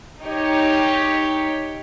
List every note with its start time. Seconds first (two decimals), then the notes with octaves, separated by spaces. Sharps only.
0.23 D#4 G4 C#5